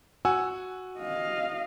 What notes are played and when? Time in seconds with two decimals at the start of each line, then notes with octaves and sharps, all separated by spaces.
0.25 F#4 F#5 G#5 E6
0.99 D#5 F5